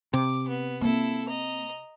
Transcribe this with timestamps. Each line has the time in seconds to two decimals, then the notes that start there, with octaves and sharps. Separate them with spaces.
0.13 C3 D6
0.48 B3
0.81 A#3 C4 E4 A4
1.28 D#5 A#5